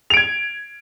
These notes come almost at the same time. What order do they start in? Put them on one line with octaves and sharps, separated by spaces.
F7 D7 G#6